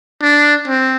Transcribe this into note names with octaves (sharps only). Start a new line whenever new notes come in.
D4
C4